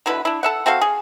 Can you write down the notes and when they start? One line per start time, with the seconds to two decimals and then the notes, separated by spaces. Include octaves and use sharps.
0.06 B2 D3 E4 B4
0.25 D4 E4
0.43 A4 E5 F#5
0.66 C4 F#4 A4 F5
0.81 G#4